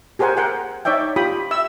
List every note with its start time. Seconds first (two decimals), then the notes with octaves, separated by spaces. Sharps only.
0.19 G4 G#4 A#4 C5 F#5 G#5
0.37 A#4 F#5 G5
0.85 D#4 C#5 D5 E5 G5
1.16 F4 G4 G5 B5 D#6
1.51 E5 E6